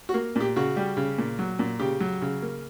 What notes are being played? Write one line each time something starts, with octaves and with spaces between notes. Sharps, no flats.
F#4
A#3
A#2 G4
C#3 F#4
G3
C#3
A#2
F#3
A#2
C#3 G4
F#3
C#3
A#3